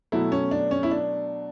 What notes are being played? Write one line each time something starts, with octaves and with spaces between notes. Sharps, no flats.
B2 F#3 A3 E4
C#4
D4
C#4
E4
D4